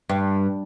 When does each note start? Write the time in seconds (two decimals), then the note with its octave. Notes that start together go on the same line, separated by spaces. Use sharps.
0.09 G2